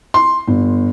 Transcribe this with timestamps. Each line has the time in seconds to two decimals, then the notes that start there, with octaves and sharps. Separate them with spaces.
0.14 C6
0.48 G1